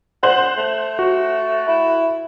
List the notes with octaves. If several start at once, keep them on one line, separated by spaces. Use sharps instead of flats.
C5 F#5 F#6
A3
F#4
E4